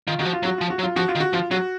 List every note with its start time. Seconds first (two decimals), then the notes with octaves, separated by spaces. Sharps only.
0.08 D#3 F4
0.19 D#3 F#4
0.25 F3
0.33 F4
0.43 F#3 F#4
0.58 F3 F4
0.70 F#4
0.79 F#3
0.83 F4
0.96 F3 F#4
1.09 F4
1.15 D#3
1.20 F#4
1.33 F3 F4
1.51 F#3 F#4